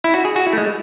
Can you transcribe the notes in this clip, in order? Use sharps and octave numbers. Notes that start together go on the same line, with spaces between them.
E4
F#4
G#4
F#4
E4
A3
G#3